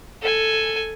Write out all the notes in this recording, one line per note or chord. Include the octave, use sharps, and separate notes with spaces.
A4 G#5